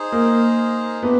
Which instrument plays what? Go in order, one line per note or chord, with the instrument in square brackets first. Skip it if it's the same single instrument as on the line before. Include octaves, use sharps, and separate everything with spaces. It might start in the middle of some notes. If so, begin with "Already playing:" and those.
Already playing: [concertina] D#4 G#4 C5
[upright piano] A#3
[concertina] A3 D4 G4 [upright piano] B3